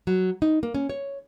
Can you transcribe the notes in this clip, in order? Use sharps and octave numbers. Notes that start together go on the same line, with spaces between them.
F#3
D#4
A#3
C#4
C#5